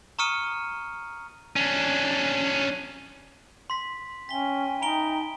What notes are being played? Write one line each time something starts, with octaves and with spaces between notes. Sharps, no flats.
A#5 C#6 D#6 F6 C#7 D#7
C#4 D4
C6 B6
C#4 E5 G5 G#5 B6 G7
D#4 A#5 B5 D7 G7